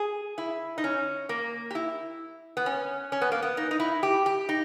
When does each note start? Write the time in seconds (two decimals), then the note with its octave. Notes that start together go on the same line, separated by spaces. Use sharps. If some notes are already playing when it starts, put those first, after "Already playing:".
Already playing: G#4
0.38 E4
0.78 D#4
0.84 C#4
1.29 A#3
1.71 G4
1.75 E4
2.57 B3
2.66 C#4
3.12 C#4
3.21 B3
3.32 A#3
3.42 B3
3.57 D#4
3.71 D#4
3.80 E4
4.03 G4
4.26 G4
4.49 D#4